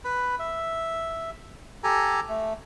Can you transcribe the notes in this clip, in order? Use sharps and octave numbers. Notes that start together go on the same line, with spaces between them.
B4 B5
E5
G4 A4 G#5 A#5
A3